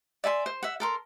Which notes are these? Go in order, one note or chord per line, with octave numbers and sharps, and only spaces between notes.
D5 E5 G#5 C6
C5
E5 F#5
A4 A#4 C6